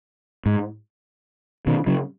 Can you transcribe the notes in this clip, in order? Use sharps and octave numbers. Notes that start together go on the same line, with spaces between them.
G#2
B2 D#3
C#3 F#3